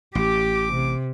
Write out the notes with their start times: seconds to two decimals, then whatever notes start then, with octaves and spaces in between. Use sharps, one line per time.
0.15 A1 G4 D6
0.72 C3